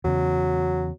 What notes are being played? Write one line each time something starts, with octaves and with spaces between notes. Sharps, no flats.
E2 C#3 F#3